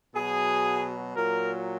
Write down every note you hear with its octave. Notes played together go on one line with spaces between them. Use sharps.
B2 F#3 G#4
A#2 F#3 A#4